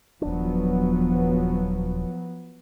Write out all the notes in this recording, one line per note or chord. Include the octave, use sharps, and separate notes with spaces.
D#1 F3 F#3 B3 D4